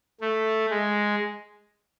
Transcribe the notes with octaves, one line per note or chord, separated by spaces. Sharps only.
A3
G#3